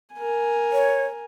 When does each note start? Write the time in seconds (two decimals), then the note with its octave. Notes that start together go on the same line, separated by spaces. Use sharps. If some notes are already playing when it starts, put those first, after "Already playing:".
0.14 A#4 G#5
0.72 C#5